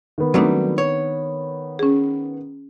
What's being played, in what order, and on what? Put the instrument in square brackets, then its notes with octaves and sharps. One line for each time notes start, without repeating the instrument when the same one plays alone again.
[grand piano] D#3 B3
[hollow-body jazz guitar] F#3 G3 A3 [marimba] C4 D4 D#4
[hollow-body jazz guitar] C#5
[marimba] C#4 G#4